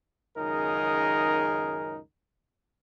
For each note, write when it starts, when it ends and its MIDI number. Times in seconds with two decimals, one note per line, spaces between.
0.37 1.99 37
0.37 1.99 42
0.37 1.99 51
0.37 1.99 63
0.37 1.99 68
0.37 1.99 70